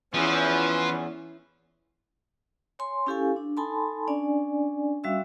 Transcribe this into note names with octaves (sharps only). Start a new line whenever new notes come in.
E2 E3 F3 C#4 E4 B4
C#5 G#5 C6
C#4 E4 G4 A4 F5 G#5
D4
D#4 A4 G#5 A5 B5 C6
C#4 D4 D5 G#5
G3 C#4 F#4 E5 F5 E6